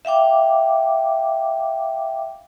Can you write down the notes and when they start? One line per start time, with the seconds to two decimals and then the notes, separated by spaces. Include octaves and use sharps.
0.05 E5 F5 G5 D6